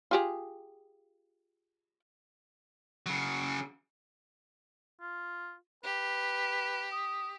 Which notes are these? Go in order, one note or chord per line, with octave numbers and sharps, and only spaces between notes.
F4 G4 G#4
C#3 F#3
F4
G4 B4
D#6